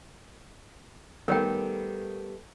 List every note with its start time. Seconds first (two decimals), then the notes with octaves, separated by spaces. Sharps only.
1.28 D#3 G3 A3 B3 A#4 C#5 G5